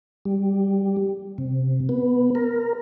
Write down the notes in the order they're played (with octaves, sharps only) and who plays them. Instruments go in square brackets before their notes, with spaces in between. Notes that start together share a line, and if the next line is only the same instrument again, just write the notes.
[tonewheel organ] G3
C3
B3
A#4